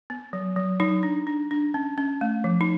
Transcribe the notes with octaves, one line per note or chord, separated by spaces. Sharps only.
B3
F#3
F#3
F#3 D#4
D4
D4
D4
C#4
C#4
A3
F3
D#4